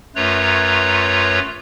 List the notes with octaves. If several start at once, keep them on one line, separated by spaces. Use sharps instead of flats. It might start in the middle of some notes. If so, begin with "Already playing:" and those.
F#2 A3 F4 B4 C#5 A#5